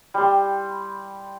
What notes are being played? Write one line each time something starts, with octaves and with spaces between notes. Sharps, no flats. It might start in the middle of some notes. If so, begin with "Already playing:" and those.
G3 C6